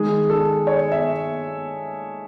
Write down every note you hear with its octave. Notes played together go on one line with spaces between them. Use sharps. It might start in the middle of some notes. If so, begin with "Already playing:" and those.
Already playing: D#3 G#3 G#4
A4
C#5
E5